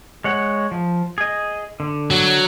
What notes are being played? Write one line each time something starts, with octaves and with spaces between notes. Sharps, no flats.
G#3 C#5 F#5
F3
G#4 D#5
D3
F#3